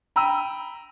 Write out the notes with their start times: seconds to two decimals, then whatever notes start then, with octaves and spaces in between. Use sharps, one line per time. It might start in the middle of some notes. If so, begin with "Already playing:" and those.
0.16 G5 A#5 B5 E6 D#7